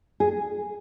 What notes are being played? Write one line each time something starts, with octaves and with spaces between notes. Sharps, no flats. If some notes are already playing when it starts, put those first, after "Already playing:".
G#4